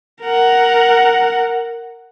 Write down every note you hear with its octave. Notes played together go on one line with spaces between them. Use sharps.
A#4 F#5